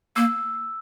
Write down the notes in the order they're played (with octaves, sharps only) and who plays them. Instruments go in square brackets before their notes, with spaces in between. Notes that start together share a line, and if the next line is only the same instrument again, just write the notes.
[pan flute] A#3 [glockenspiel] E6